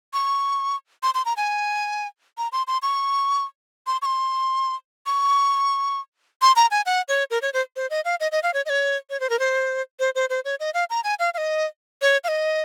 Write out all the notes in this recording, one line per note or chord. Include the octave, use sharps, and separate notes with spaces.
C#6
C6
C6
A#5
G#5
A#5
C6
C6
C#6
C6
C#6
C6
C#6
C6
A#5
G#5
F#5
C#5
A#4
C#5
C5
C5
D#5
F5
D#5
D#5
F5
C#5
D#5
C#5
C#5
C5
A#4
C5
C5
C5
C5
C#5
D#5
F5
A#5
G#5
F5
F5
D#5
C#5
F5
D#5